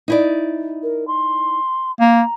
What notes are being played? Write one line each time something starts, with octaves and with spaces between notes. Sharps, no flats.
D#4 E4 D5
A#4
C6
A#3 A#5